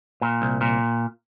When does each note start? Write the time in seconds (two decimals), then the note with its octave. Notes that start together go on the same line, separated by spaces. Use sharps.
0.21 A#2
0.42 C2
0.61 A#2